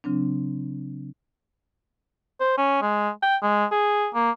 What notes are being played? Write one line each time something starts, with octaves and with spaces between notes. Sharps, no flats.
C#3 F#3 C4 D4
C5
C#4
G#3
G5
G#3
G#4
A#3